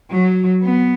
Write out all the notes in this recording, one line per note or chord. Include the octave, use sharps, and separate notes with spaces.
F#3
B3